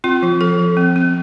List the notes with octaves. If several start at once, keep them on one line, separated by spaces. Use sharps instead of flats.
C4 F4
F3
F3 A4
F3
C4
C4